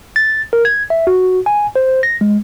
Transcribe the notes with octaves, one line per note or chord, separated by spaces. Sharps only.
A6
A#4
G#6
E5
F#4
G#5
C5
A#6
G#3